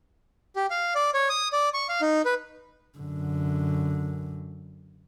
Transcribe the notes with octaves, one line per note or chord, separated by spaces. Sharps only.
G4
F5
D5
C#5
D#6
D5
C#6
F5
D#4
B4
F#2 D3